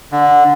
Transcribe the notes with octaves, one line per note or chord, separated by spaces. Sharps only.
D3